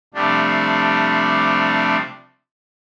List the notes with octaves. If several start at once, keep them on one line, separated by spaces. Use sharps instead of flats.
C3 F3 G3 A3 D4